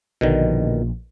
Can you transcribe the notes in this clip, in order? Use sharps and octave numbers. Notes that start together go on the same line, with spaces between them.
A#1 B2 D3 D#3